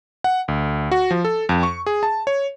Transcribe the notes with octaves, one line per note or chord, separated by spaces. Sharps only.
F#5
D2
F#4
F3
A4
F2
C#6
G#4
A5
C#5